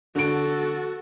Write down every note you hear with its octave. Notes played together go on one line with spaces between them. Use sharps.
D3 F#4 A4 D7